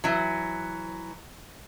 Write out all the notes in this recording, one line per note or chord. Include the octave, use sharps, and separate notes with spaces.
E3 F#3